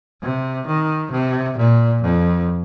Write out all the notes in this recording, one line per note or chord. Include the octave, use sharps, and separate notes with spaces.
C3
D#3
C3
A#2
F2